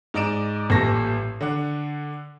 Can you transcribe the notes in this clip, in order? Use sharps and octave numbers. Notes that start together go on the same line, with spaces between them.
G#2 D5 D#5 D7 E7
A1 A#2 G3 A4 C#6 A#6
D3 D4 F#5